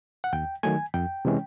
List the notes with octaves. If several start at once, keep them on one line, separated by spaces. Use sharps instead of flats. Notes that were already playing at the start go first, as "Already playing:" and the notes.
F#5
D#2 G5
D#3 F#3 A3 G#5
F2 G5
C3 E3 G#3 C#4